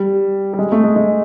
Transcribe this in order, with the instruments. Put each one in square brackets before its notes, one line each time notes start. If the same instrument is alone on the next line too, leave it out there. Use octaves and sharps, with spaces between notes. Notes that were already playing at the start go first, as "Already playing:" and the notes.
Already playing: [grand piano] G3
G3
G#3
A3
G#3
G#3